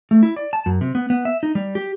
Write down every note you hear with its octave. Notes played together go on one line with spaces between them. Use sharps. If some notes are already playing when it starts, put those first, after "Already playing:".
A3
E4
D5
A5
F#2
C3
B3
B3
E5
D#4
G3
G4